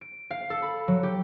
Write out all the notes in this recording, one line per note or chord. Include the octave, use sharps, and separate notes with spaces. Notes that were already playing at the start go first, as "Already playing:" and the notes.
D7
F5
A4
B5
F#3
G4